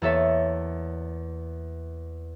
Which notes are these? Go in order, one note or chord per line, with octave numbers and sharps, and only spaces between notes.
E2 A#3 A4 C#5 E5 A6